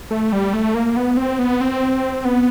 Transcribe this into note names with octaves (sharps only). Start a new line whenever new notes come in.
A3
G3
A3
A#3
B3
C4
B3
C4
B3